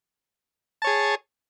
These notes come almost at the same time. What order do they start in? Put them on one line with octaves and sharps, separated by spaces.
A5 C#5 G#4